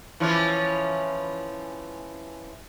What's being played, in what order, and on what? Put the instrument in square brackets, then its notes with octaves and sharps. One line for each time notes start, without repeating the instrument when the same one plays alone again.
[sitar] E3 F3 C#4